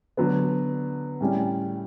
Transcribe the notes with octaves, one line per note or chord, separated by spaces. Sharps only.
D3 F#3 B3
A2 G3 C#4